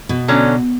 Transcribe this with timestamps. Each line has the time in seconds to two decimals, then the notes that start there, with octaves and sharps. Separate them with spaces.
0.09 B2
0.28 D3 F#3 C#4